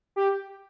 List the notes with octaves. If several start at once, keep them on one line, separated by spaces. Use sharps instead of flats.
G4